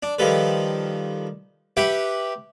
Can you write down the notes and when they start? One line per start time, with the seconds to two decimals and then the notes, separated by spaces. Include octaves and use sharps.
0.03 D4
0.19 D#3 F3 G3 A4 B4
1.77 G4 B4 E5 F#5 G5